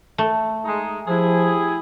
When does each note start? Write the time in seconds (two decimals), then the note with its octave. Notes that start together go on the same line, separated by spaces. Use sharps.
0.18 A3
0.65 G#3 D#4
1.08 F3 E4 G4 G#4